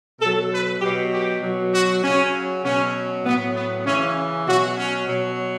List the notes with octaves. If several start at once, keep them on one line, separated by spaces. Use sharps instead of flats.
B2 F#3 A4
B4
B2 F#3 G4
G4
B2 F#3
F#4
C#3 F#3 C#4
B2 F#3 C#4
A2 F#3 B3
B3
C#3 E3 C#4
B2 F#3 F#4
C#4
B2 F#3